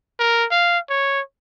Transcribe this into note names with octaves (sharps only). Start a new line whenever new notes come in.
A#4
F5
C#5